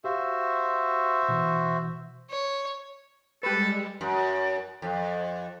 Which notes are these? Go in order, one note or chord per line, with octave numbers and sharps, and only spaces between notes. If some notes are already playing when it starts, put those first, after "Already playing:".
F#4 G4 C5 E5 F5
B2 E3
C#5
G3 G#3 G4 A4 B4
F#2
F2